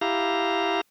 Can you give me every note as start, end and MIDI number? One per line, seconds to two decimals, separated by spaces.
0.01 0.81 64
0.01 0.81 67
0.01 0.81 77
0.01 0.81 82